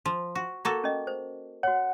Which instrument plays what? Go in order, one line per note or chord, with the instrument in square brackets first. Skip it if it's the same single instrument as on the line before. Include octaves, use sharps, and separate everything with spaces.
[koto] F3
F#4
A#3 F#4 A4
[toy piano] C#4 D#5
C5
[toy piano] F#4 C#5 [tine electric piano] F#5